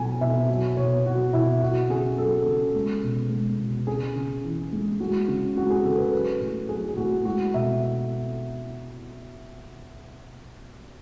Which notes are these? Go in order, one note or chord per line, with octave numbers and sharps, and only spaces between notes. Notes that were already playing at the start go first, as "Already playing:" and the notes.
Already playing: B2 F#3 G#5 A5
B2 E5
F#3
B2 C#5
F#3 F#4
B2 E4
F#3 F#4
C#3 G#4
F#3 A4
C#3
G#3
B2
G#3
B2
C#3 G#4
C#3
E3
G#3
G#3 F#4
C#3
G#3 F#4
G#4
C#3 A4
B4
F#3 B4
A2
F#3 G#4
G#4
A2 F#4
G#3 F#4
B2 E5